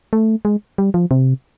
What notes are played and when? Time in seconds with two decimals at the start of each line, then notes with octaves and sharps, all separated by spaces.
0.13 A3
0.45 G#3
0.78 G3
0.94 F3
1.11 C3